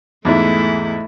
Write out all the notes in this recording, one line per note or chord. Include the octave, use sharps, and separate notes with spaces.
E2 G#2 G#3 A3 E4